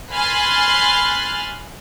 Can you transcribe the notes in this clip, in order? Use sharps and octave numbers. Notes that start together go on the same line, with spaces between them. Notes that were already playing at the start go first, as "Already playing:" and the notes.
G#5 B5 C6 F6 F#6 A6